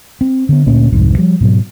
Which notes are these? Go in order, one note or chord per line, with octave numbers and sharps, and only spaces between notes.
C4
D3 B3
D2 A#2 A#3 C#4
C2 F2 G#2
F3 G3
G#2 B2 F#3